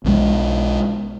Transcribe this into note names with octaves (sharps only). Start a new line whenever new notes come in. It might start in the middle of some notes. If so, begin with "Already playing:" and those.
B1 B2 D3 G#3